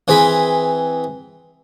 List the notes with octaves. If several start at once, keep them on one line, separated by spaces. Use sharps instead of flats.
E3 C4 G#4 B5